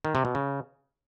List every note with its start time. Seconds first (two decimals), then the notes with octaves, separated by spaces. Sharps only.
0.05 D#3
0.15 C3
0.25 B2
0.35 C#3